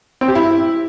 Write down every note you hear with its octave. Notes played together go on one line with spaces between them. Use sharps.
C4
G4
E4